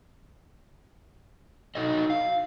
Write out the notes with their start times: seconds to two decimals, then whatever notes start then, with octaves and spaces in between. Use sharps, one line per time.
1.75 D#4 F#4 A4 D#5
2.10 F5